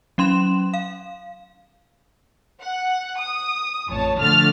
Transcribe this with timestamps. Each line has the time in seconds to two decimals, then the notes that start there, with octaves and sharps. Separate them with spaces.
0.18 F#3 C#4 C6 E7
0.74 F5
2.62 F#5
3.20 D#6
3.88 A1 F2 C#5 A5
4.18 D3 F3 A3 F6 A6